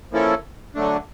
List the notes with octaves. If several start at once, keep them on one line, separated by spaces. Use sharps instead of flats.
F3 A#3 C#4 E4 A4
D3 F#3 A3 D4